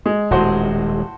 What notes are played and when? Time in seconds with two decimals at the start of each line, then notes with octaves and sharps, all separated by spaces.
0.06 G#3
0.31 D#1 A2 G#3 F#4 C5